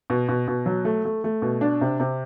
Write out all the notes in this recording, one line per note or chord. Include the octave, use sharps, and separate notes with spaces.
B2
B2
B2
F#3
A3
A3
A3
B2
D4
C3
C3